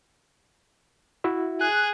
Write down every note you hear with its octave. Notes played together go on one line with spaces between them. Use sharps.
E4 F#4 E5
G#4 F#6